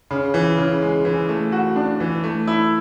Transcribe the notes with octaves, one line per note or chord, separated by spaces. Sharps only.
C#3
E3
C#3
G#3
E3
A3
F#4
D4
E3
A3
E4